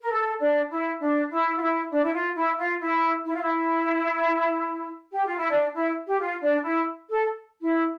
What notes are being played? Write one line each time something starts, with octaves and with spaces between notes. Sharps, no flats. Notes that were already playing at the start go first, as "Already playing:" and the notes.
A#4
A4
D4
E4
D4
E4
F4
E4
D4
E4
F4
E4
F4
E4
E4
F4
E4
G4
F4
E4
D4
E4
G4
F4
D4
E4
A4
E4